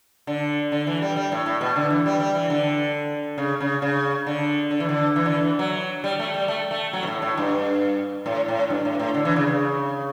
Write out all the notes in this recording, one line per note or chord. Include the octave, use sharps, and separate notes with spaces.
D3
D3
E3
G3
G3
A2
A2
B2
D3
E3
G3
G3
E3
D3
C#3
C#3
C#3
D3
D3
E3
D3
E3
D3
E3
F#3
G3
A3
G3
A3
A3
F#3
B2
A2
A2
G2
A2
A2
G2
A2
A2
D3
E3
C#3
C#3